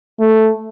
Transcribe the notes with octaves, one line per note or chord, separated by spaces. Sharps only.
A3